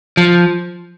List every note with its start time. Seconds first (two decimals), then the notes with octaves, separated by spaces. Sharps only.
0.17 F3